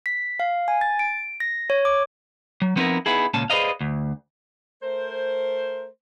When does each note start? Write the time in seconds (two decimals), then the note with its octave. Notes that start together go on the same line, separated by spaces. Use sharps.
0.06 B6
0.40 F5
0.68 G#5
0.81 A6
0.99 D7
1.40 A#6
1.70 C#5
1.85 D6
2.62 F#3
2.76 F3 B3 C4 D#4 E4 A#4
3.06 B3 D#4 E4 G#4
3.34 C#2 A#2 C#4 A5
3.50 G#4 B4 C5 D5 D#5 F5
3.81 D2
4.83 A3 A#4 C5